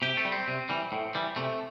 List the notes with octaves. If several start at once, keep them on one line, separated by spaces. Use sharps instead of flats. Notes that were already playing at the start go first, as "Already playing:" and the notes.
C3 G4
A3
G3
C4
C3
E3 G3
A2
E3 G3
C3 A3